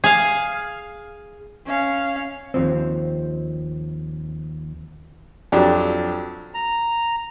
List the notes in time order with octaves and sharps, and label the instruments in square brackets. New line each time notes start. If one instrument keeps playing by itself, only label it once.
[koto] G#4 F5
[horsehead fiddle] C#4 F5
[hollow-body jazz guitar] D#2 G#2 F3 C4
[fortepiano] F2 F#3 D4 G4
[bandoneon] A#5